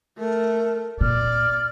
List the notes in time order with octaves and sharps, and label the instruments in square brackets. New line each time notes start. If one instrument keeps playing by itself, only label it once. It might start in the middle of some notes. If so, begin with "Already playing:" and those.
[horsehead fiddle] A3 [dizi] A#4
[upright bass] A#2 [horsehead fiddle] D5 [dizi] F6